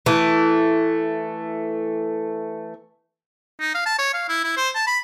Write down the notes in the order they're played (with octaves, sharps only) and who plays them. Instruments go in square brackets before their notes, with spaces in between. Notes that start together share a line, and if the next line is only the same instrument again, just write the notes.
[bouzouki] E3 A3
[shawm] D#4
F5
A5
C#5
F5
E4
E4
C5
A5
B5